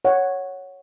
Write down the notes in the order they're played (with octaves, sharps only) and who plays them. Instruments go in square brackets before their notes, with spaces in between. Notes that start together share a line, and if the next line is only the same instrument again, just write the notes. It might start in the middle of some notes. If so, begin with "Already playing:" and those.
[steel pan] C#5 F#5